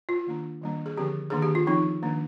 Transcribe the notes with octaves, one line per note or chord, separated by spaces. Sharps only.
F4
D#3 A#3 D4
D#3 G3 A#3 D4
G#4
D3 F3 C4 G4
D#3 A#3 D4 G#4
G4
F4
F3 C4 D#4
D#3 A#3 D4